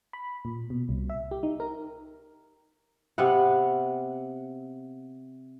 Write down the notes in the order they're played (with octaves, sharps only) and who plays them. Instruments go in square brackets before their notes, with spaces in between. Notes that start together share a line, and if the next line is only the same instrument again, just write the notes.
[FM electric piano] B5
A#2
B2
C2
E5
G4
D#4
A#4
[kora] C3 B3 F5 F#5